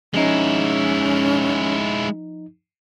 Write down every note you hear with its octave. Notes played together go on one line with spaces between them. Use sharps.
F3 G#3 C#4 D#4 E4